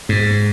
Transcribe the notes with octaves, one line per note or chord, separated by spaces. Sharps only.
G#2